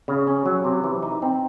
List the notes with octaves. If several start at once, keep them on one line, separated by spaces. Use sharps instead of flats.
C#3
C#4
F#3
C3
E3
D#4
C4